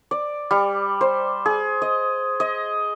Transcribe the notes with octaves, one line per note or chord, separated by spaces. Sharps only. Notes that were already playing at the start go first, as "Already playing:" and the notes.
D5
G3
C5
G#4
D#5
D#5